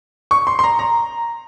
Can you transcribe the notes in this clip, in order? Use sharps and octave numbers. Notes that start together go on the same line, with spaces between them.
C#6
C6
C6
A#5
A#5